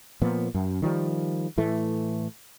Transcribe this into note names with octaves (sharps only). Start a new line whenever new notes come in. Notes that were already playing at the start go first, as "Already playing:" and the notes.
A#2 F3 B3
F#2
D#3 F3 G3
A2 E3 A3